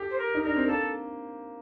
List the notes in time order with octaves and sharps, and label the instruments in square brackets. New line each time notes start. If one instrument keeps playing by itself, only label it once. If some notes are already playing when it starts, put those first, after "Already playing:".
Already playing: [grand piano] G4 A4
[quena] C5
A#4
[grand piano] D#4
[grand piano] D4 [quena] A#4
[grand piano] C4
[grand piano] A#3 [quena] A4